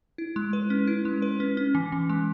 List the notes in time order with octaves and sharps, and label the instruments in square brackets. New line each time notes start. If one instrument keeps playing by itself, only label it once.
[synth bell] E4
G#3
B4
C#4
E4
G#3
B4
C#4
C#4
E3
E3
G#3